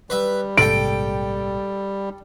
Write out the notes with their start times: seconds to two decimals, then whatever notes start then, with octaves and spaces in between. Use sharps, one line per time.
0.10 G3 B4 E5
0.58 A#1 G#2 C3 A4 G5 D7